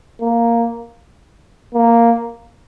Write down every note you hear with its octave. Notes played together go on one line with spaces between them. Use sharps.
A#3
A#3